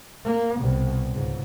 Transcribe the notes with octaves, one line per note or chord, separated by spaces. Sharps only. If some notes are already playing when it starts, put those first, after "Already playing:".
A#3
C2 B2
C#2 G#2